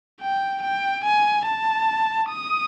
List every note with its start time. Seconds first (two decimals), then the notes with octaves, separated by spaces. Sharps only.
0.21 G5
0.63 G5
1.04 G#5
1.46 A5
2.30 D#6